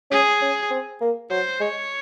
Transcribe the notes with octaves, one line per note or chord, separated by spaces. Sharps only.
C#4 G#4
C#4
C4
A#3
F#3 C5
G#3 C#5